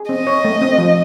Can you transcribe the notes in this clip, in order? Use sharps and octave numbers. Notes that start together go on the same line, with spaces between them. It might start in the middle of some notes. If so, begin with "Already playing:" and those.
Already playing: G#4
C4 D#5
C#5
A3
C4
F3